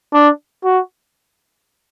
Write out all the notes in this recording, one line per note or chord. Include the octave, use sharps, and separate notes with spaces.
D4
F#4